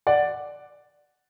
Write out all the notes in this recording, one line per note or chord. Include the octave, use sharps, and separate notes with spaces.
D5 F#5